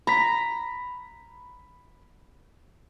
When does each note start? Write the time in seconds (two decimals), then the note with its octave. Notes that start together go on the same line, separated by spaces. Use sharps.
0.07 A#5 B5 B6